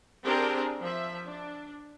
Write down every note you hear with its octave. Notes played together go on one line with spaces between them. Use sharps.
C4 D4 G4 G#4 A#4
F3 E5
D4